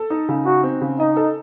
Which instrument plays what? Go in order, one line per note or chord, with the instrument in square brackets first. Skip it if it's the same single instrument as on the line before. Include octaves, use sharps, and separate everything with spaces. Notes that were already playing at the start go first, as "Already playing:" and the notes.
Already playing: [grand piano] A4
D#4
C#3
[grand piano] D#4 [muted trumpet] F#4
[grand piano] C4
C#3
[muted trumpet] D#4 [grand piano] D#5
[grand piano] A4